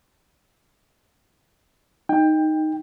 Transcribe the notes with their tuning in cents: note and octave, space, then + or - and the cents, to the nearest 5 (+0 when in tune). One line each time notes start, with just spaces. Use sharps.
D#4 +0 G5 +20